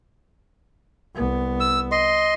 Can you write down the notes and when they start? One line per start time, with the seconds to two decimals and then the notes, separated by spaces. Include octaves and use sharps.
1.15 C2 B3
1.60 E6
1.92 D#5 C6